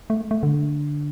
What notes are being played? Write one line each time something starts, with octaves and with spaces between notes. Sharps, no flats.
A3
A3
D3